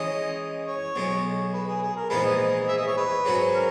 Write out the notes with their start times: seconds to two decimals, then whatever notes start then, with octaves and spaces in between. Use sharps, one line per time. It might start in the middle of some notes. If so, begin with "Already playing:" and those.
Already playing: E3 G#3 C#4 D#5
0.67 C#5
0.96 B1 B2 G#3
1.53 B4
1.67 G#4
1.82 G#4
1.96 A#4
2.10 A#1 G#2 E3 G#3 B3 B4
2.25 D#5
2.68 E5
2.77 D#5
2.87 C#5
2.97 B4
3.25 G#2 F#3 C#4 F#4
3.54 A#4